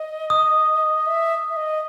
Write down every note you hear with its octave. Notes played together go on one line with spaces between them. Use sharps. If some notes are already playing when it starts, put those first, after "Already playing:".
Already playing: D#5
D#6
E5
E5
D#5